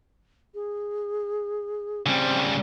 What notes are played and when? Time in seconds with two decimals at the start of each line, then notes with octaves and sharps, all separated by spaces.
0.54 G#4
2.06 C#3 G3 C4